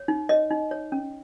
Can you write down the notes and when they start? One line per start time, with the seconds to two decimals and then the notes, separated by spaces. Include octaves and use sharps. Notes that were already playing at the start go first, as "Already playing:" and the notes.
Already playing: C#5
0.08 D#4
0.29 C#5 D#5
0.51 D#4
0.71 C#5
0.92 C#4